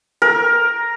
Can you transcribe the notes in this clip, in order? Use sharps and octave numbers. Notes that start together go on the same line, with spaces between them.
A#4